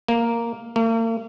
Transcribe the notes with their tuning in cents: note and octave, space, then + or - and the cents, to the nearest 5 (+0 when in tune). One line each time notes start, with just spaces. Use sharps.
A#3 -5
A#3 -45